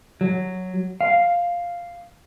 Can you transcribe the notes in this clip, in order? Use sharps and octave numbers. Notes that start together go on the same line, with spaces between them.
F#3
F5